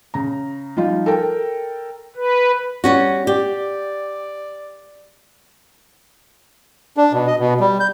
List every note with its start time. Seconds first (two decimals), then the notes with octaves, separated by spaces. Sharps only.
0.14 C#3 A#5
0.77 F3 G3 D#4 F4
1.06 A4 A#4 G5
2.16 B4
2.84 G3 C#4 F#4
3.27 G4 D5
6.97 D4
7.13 B2
7.27 D#5
7.39 B2
7.60 G3
7.80 G6